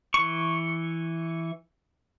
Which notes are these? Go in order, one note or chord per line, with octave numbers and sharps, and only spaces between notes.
E3 C#6